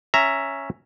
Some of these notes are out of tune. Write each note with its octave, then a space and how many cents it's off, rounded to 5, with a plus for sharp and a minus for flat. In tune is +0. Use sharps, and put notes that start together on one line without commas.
C#4 +0 E5 +5 A#5 +0